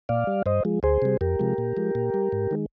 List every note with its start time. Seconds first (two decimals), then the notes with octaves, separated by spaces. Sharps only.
0.09 A#2 D5 F5
0.27 G3
0.46 G2 C5 D#5
0.65 F3 G#3
0.83 D2 G#4 C5
1.02 C3 G3
1.21 F2 G4 A#4
1.39 C3 F3 G#3
1.58 A#2
1.77 F3 G#3
1.95 A#2
2.14 G3
2.32 G#2
2.51 D#3 G#3